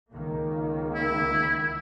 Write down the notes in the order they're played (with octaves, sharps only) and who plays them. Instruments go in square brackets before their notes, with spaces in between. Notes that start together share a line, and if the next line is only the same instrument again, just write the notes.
[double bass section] C#2 D#3 A#3
[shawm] E4